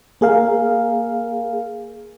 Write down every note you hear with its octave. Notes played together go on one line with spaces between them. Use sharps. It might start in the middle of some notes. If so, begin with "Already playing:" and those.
A#3 G#4 A#4 F5